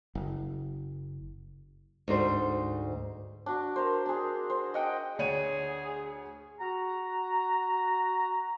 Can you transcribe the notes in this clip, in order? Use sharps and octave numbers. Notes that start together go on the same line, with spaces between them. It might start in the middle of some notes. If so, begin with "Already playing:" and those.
F#1
D2 G#2 C5
D4 F#4
A#4 C5
D4 G#4
C5
D#5 F#5 G5
D2 G#4 C#5 D#7
F#4 A#5